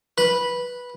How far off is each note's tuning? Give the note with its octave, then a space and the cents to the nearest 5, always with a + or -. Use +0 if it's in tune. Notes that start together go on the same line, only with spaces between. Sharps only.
B4 -10